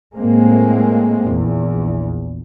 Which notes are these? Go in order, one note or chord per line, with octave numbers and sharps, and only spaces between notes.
A2 G#3 A#3 C4
A#1 E2